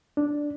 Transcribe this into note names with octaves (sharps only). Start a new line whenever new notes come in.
D4